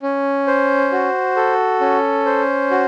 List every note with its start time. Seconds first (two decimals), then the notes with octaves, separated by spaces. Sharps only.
0.03 C#4
0.47 C5
0.92 F#4
1.36 A4
1.81 C#4
2.26 C5
2.71 F#4